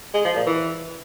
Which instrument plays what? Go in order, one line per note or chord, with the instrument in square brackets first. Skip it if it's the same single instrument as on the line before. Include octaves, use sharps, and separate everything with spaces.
[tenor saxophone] G#3
F3
A#2
E3